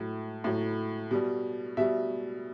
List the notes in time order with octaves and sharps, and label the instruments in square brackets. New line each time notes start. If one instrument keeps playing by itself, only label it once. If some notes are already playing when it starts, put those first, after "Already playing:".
Already playing: [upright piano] A2 F#3
A2 F#3
B2 G3
B2 G3 E5